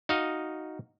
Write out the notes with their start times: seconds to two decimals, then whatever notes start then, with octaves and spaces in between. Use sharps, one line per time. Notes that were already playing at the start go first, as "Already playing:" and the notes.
0.09 D#4 F#4 D#5 F5